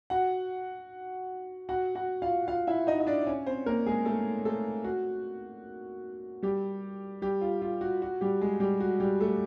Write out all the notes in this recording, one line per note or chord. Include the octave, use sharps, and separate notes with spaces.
F#4 F#5
F#4 F#5
F#4 F#5
F4 F5
F4 F5
E4 E5
D#4 D#5
D#5
D4 D5
C#4 C#5
C4 C5
A#3 A#4
G#3 G#4
A3 A4
A3 A4
F#4
G3 G4
G3 G4
F4
F4
F#4
F#4
G3 G4
G#3 G#4
G3 G4
F#4
G3 G4
A3 A4